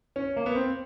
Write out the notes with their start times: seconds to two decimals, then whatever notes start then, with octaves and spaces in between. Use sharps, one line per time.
0.16 C#4
0.37 A#3
0.46 B3
0.55 C4